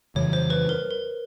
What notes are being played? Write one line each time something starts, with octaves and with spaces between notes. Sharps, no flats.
F2 C#3 E3 G3 C#5
C5
B4
A#4
A#4